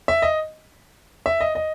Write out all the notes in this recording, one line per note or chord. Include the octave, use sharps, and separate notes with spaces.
E5
D#5
E5
D#5
D#5